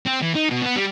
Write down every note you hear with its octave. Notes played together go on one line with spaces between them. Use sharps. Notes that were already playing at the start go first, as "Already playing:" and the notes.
C4
E3
D#4
B2
B3
G3